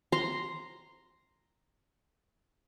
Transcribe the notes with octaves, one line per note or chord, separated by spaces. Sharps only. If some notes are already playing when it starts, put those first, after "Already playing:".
A#5 C6